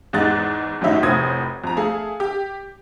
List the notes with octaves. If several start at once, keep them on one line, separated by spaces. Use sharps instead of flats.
E2 G#2 G#3 D#4 F#6 A6
G#1 F#2 A2 F#3 D#4 E5
F1 A2 C5 D#6 G#6
F2 A#5
A3 G#4 F5
G4